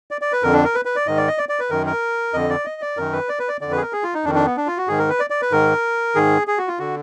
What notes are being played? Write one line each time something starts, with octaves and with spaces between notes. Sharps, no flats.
D5
D5
B4
F2 D3 A#4
D4
A#4
B4
B4
D5
G#2 D#3 D#5
D5
D#5
D5
D5
B4
F#2 D#3 A#4
A#4
F2 D3 D#5
D5
D#5
D5
F#2 D#3 A#4
B4
D5
B4
D5
F2 D3 D5
B4
G#4
A#4
G#4
F4
D#4
F2 D#3 D4
D4
B3
D4
F4
F#4
G#2 D#3 G#4
A#4
B4
D5
D5
B4
G#2 D#3 A#4
G#2 D#3 G#4
G#4
F#4
F4
D3 F#4